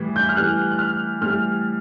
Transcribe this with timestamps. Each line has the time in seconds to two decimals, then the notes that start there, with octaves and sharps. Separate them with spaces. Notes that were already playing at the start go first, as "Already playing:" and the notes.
Already playing: A2 E3 G3
0.16 G6
0.29 F6
0.36 A2 E3 G3 F#6
0.71 F#6
0.79 F6
1.21 A2 E3 G3 F6